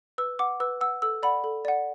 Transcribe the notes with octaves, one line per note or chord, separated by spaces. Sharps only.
B4 E6
F#5 D6
B4 E6
F#5 E6
A4 E6
D5 F#5 B5
A4
D5 F#5